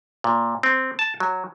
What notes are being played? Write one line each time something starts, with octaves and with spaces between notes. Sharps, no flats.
A#2
C4
A5
F#3